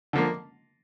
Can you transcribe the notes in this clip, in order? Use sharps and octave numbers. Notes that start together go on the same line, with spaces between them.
D3 F3 A#3